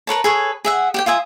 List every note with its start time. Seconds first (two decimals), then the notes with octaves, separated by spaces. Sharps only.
0.07 A#4 B4 C#5 A5
0.24 G#4 A4 B4 C#5
0.65 G#4 E5 F#5
0.94 G4 F#5 G5
1.06 F4 E5 G#5 D#6